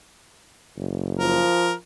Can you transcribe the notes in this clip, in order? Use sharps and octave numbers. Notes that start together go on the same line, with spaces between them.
F#1
F3 A#4